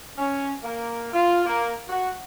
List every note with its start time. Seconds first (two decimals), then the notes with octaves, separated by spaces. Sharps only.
0.18 C#4
0.64 A#3
1.13 F4
1.46 A#3
1.89 F#4